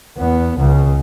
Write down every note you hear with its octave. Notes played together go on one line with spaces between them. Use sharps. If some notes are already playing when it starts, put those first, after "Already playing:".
E2 B3
C#2 C#3